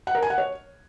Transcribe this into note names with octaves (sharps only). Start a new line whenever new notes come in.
F#5
A#4
G#5
F#5
C#5